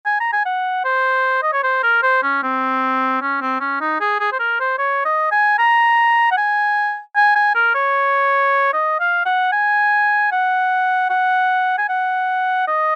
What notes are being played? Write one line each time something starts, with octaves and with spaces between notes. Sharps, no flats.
G#5
A#5
G#5
F#5
C5
D#5
C#5
C5
A#4
C5
C#4
C4
C#4
C4
C#4
D#4
G#4
G#4
C5
A#4
C5
C#5
D#5
G#5
A#5
F#5
G#5
G#5
G#5
A#4
C#5
D#5
F5
F#5
G#5
F#5
F#5
G#5
F#5
D#5